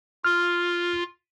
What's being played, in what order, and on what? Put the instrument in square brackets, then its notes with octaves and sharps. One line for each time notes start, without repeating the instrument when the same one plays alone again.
[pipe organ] F4 [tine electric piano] F6